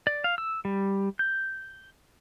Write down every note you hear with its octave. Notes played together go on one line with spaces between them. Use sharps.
D5
F5
E6
G3
G6